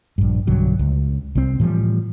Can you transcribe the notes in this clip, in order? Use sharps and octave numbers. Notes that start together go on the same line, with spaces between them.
A#1 G2
B1 G2 D3 F#3
C#2
C2 C4
A2 E3 F3 G3